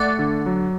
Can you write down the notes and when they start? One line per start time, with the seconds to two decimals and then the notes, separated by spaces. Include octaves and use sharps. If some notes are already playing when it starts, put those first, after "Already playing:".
Already playing: A3 D5 F#5
0.19 D3
0.46 F#3